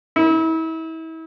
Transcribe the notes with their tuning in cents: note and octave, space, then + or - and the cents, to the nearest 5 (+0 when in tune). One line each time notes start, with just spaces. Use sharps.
E4 -35